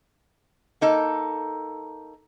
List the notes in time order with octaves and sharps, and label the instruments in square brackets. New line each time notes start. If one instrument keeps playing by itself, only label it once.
[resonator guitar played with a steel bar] A#3 D#4 A4